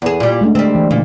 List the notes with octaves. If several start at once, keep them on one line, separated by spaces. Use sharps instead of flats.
E2 G#4
A#2 G3
G#3 A3 D4
D3 G3 C4
E3
A#2 C#3